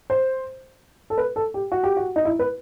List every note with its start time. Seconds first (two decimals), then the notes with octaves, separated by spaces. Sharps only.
0.10 C5
1.10 A4
1.18 B4
1.36 A4
1.54 G4
1.72 F#4
1.84 G4
1.97 F#4
2.16 D#4
2.25 E4
2.39 B4